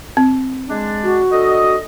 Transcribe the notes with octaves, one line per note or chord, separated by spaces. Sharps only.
C4
G#3 D4
F#4
D3 A4 D#5